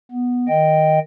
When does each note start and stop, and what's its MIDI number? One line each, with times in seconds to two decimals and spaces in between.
0.11 0.48 59
0.48 0.99 51
0.48 0.99 75
0.48 0.99 79